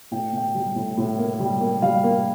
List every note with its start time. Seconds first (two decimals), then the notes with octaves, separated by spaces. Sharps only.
0.11 A2 G5
0.33 A2 G5
0.55 G3
0.75 A2
0.97 A2
1.18 A#3
1.39 G3
1.61 A#3
1.82 G3 F5
2.04 A#3